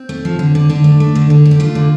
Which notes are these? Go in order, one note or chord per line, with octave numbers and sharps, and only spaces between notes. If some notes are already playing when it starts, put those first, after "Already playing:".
Already playing: C4
A3
F3
D3
D3
D3 D4
A3
A3
D3
D3
A3
G4
A3 F4
D3